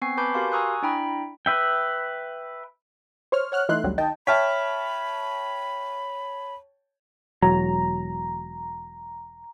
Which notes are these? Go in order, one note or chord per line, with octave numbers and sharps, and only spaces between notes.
B3 C4 G#5 C#6 C7
B4 G#5 A5 B5 D6 G6
F#4 G4 A#4 F5 C6
G#5 A#5 C#6 D#6 E6 F#6
D4 E4 G5 A#5 B5
B4 E5 G5
C5 C#5 F6
C#5 F#5 F6 F#6
E3 A3 D#4 E4 C6 F#6
A1 D2 D3 F#3 G3
D#3 D#5 G5 A5
C#5 E5 G5 A5 B5 F6 B6
E1 F#3 A#5